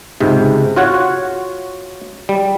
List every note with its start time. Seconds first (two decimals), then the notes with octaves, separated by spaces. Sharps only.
0.20 C#2 G#2 C3
0.76 F4 F#4 C#5 F#5
2.29 G3